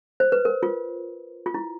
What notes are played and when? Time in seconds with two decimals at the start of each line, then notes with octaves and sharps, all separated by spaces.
0.20 C5
0.32 B4
0.45 A#4
0.63 F4
1.46 F4
1.54 E4